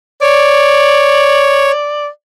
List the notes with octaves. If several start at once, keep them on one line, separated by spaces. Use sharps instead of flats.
C#5 D5